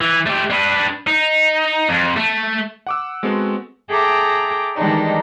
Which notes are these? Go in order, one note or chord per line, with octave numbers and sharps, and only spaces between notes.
E3
A3 G4
D4 B4
D#4
F2
A3
F#5 D6 E6
G#3 B3 C4 F#4 A4
G#4 A4 E5 G5 A#5 D6
D#3 E3 G3 G#3 D4 D#4